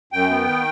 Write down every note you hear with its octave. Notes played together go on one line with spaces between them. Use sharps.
F#2 G5
B3
D#3